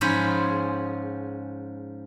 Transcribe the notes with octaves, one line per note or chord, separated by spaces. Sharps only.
G#2 F3 C#4 G#4 C5 B5